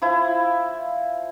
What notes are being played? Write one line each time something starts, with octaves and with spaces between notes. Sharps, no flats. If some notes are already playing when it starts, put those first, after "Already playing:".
F3 E4